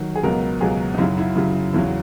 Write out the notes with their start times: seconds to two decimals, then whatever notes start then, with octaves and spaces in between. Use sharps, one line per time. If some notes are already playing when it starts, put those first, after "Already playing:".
Already playing: D#3 F#3
0.16 G#4
0.23 C#2 B2 F#3 A#4
0.61 C#2 B2 F#3 G#4
0.94 D#4
0.98 F#2 C#3 F#3 E4
1.18 E4
1.36 F#2 C#3 F#3 E4
1.73 E2 C#3 F#3 E4